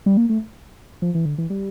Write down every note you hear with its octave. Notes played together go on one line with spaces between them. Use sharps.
G3
A#3
A3
F3
E3
D3
E3
G3